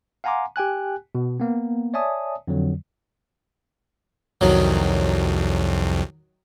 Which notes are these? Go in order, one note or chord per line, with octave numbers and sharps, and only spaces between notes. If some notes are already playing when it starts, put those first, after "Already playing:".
F5 F#5 G#5 A#5 C6 D6
G4 G5 G#5 F#6
B2
A#3 B3
C#5 D5 E5 G#5 A5 D#6
F2 D3 F#3
C2 F2 D#3 F#3